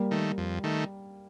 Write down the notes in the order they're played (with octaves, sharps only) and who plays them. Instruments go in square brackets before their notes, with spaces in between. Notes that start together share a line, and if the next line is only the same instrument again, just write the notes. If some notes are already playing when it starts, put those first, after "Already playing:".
Already playing: [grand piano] G3 A#3
[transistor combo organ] D#3 A3
F2
D#3 A3